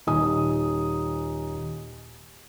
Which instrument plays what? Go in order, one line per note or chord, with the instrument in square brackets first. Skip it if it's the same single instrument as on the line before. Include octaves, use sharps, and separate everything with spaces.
[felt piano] D#1 D#4 G#5 D#6